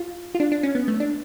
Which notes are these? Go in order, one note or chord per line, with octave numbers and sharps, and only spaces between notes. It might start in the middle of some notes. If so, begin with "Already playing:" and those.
Already playing: F4
F4
D4
D4
C#4
B3
A3
D4